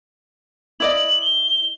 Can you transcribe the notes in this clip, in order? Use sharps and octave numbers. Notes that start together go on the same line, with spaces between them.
E4 D5 D#5 F#7
G7